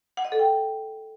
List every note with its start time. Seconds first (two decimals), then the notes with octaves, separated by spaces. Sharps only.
0.17 F#5
0.25 D#5
0.32 A4
0.39 G5